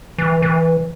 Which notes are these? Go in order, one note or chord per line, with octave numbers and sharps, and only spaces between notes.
E3
E3